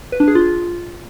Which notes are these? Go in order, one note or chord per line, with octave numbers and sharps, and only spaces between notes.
B4
D4
G#4
F4